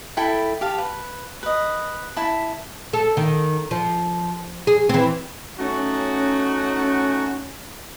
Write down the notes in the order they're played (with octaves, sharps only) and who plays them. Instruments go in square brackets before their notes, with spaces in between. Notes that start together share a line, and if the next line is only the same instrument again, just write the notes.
[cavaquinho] E4 A4 G5 B5
G4 F5 A5
B4
B4 D#5
E4 A5 B5
[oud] A4
D#3
F3
G#4
E3 C4
[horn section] A3 D#4 F#4 [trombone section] C#4